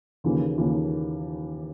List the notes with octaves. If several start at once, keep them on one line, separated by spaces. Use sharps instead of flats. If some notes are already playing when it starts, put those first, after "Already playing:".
D#2 C#3 E3 A#3
D#2 C#3 E3 A#3